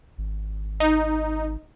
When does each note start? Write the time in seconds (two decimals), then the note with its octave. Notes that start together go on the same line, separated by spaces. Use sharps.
0.18 G#1
0.80 D#4